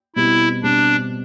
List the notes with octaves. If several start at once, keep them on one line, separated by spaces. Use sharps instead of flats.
B2 G3 C4 E4 G4
B2 G3 C4 D4 G4